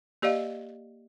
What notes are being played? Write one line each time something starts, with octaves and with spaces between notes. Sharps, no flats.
A#3 G4 D5 D#5 F5